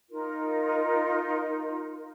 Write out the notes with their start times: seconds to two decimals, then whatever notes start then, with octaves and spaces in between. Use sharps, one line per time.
0.11 D#4 F4 A#4